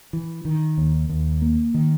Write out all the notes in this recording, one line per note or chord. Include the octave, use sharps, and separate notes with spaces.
E3
D#3
D#2
D#2
A#3
D#3